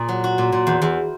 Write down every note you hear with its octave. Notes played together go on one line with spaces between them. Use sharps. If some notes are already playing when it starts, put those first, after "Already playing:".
Already playing: A#2 G#4
F#3
F#4
A#2
A#2
E2
E2